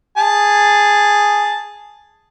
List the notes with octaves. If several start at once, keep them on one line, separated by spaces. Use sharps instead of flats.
G#4 A5